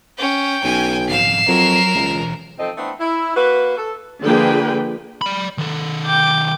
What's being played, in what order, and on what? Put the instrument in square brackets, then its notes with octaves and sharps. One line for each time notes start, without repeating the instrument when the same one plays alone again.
[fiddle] C#4 [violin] G5
[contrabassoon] B1 [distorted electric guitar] C#3 [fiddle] G#5
[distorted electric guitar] F2 G#2 [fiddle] F5 [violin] C7 E7
[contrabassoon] F2 [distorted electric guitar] F#3 F#5 [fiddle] A#4
[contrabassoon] C#2 [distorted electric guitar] E3 G#3
[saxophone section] F3 C4 D#4 A4 D#5
A3 B3 C4 D4 E4
E4
A#3 F#4 B4
A4
[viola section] D3 F3 A#3 G#4 B4 G5
[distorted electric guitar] D5 B5
D#3 A4
[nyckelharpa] G5 D6